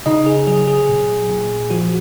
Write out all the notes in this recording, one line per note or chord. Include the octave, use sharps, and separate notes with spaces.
C#3 D#4 D#5
G#4
F#3 G#4
G#4
A#2
A#2
F3 F#4